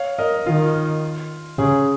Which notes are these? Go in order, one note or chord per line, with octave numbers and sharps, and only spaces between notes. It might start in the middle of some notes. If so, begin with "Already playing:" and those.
Already playing: C#5 F5
A#4 D#5
D#3 F4
C#3 G#4